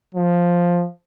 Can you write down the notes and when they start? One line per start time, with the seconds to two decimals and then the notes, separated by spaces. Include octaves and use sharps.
0.15 F3